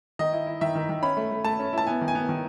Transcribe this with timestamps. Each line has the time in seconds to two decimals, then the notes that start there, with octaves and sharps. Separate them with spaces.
0.19 D#3 D#5
0.33 E4
0.47 E4
0.61 D#3 E5
0.75 D#3
0.89 D#3
1.02 C#4 B5
1.17 A3
1.31 A3
1.44 A3 A5
1.59 C#4
1.73 E4 A5
1.87 B3 G#5
2.01 D#3
2.08 G#5
2.15 B3
2.29 D#3